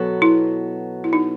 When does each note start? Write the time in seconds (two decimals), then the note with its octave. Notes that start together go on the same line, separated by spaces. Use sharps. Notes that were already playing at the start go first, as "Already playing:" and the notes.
Already playing: B2 F#3 B3 F#4 A4
0.22 E4
1.04 E4
1.13 D#4